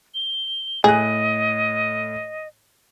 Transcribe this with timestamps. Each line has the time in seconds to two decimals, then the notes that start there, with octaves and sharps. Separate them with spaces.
0.14 G7
0.84 A2 G#4 D#5 F#6